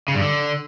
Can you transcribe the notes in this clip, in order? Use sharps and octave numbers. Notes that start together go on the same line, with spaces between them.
C#3
G2
D3